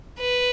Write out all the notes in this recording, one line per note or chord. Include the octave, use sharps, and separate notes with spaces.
B4